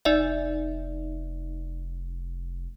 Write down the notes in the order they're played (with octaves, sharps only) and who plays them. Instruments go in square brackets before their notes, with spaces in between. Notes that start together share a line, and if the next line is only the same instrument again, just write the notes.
[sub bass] F1 [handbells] D#4 D5 E5